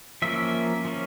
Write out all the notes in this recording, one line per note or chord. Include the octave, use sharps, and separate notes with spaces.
F3 A#3 C#4 E5
F3 A#3 C#4